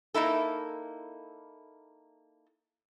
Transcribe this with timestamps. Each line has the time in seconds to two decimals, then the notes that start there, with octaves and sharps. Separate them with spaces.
0.14 A#3 D#4 E4 A4